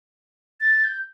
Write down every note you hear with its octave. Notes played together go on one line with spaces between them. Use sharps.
A6
G6